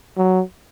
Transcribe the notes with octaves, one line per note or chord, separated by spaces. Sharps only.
F#3